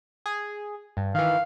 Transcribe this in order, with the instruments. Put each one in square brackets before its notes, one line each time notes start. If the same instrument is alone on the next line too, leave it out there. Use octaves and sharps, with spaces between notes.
[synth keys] G#4
G2
[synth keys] D#3 E3 [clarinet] F5